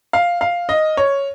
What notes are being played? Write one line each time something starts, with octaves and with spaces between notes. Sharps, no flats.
F5
F5
D#5
C#5